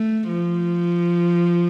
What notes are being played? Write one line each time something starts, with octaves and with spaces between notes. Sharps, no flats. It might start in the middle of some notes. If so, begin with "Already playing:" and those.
Already playing: A3
F3